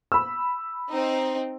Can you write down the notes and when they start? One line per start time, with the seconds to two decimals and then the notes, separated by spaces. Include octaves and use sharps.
0.12 B5 E6
0.89 C4 D#4